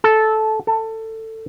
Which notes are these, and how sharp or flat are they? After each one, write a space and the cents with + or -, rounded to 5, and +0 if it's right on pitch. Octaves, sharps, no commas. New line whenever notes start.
A4 -10
A4 +20